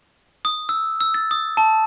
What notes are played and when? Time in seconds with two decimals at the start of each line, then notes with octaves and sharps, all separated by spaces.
0.45 D#6
0.69 E6
1.01 E6
1.14 A6
1.31 D#6
1.57 A5